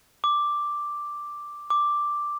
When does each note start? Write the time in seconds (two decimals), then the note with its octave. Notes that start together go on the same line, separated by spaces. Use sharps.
0.24 D6
1.70 D6